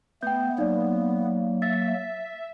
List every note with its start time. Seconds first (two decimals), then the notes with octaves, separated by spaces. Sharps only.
0.23 A3 B3 G5 G6
0.58 F#3 A#3 D#4 D5
1.62 E5 A6